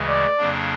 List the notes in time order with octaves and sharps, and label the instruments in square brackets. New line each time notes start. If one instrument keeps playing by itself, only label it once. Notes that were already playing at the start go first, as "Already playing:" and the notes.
Already playing: [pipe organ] D2 C#3 E3 G#3
[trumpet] D5
[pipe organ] F2 C#3 F#3 A#3 D4